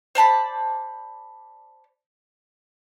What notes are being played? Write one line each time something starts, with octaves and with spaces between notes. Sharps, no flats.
C5 D5 A5 B5